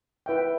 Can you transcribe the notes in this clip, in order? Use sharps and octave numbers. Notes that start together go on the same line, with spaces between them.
E4 B4 E5 G5